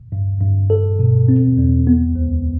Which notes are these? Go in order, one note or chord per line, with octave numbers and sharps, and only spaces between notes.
G2
G2
A4
B2
C4
E2
B3
D2